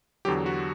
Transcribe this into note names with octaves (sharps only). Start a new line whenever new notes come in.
E2 D3 F#3 G4
F#4